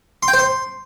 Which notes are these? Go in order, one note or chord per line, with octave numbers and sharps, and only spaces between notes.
C6
G5
C5
C6